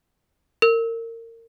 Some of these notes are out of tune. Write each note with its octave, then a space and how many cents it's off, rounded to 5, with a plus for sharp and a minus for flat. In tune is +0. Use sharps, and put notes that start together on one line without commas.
A#4 -30